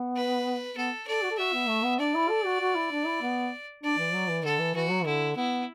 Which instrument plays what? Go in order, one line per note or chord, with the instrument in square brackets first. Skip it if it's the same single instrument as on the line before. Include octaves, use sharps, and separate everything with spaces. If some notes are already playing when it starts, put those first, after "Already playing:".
Already playing: [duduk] B3
[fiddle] B4
[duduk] B3 [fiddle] A4
[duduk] A4 [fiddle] D5
[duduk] F#4
A4
[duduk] F#4 [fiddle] E5
[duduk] B3
A3
B3
[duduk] D4 [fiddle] D5
[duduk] E4
A4
F#4
F#4
E4
D4
E4
B3
[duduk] D4 [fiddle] D5
[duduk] E3
F#3
E3
[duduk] D3 [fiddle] A4
[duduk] E3
[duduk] E3 [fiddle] F#4
[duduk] F#3
[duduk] D3 [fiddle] E4
[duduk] B3 [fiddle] E4